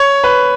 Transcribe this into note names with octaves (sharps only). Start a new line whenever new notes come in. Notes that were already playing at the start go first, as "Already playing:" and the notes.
Already playing: C#5
B4